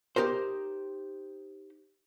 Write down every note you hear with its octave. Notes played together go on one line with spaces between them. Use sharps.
D#4 G4 A#4 C5